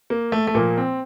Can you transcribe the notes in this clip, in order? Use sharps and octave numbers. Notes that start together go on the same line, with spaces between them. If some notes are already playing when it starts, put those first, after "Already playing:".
A#3
A3
A3
A#2 F3 A#3
C4